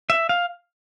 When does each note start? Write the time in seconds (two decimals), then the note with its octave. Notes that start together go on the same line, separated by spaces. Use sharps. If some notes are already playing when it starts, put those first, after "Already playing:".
0.10 E5
0.29 F5